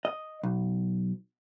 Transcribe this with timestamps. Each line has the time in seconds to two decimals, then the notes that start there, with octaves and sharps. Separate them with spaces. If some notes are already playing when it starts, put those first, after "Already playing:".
0.05 D#5
0.43 B1